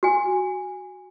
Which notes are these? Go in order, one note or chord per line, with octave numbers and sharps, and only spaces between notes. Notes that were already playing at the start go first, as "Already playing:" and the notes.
F#4 G#5